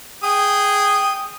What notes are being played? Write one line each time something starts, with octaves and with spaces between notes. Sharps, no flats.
G#4 G5 D#6